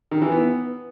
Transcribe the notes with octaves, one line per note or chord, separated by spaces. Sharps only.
D#3
E3
B3